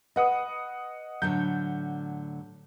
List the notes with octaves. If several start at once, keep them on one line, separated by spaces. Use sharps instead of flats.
B4 D#5 F#5 D#6
A2 D3 F#3 G6